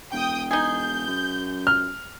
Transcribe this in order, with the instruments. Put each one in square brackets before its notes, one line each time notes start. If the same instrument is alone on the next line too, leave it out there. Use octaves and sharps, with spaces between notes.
[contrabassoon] E1 [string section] G5 D#6
[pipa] D#4 G#4 [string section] G6
[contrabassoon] F#2
[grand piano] F6